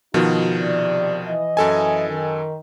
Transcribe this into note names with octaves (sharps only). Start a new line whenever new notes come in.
B2 D#3 F3 D#4 F#4
C3 D5
E3 D#5
F#2 A4 G#5
D#3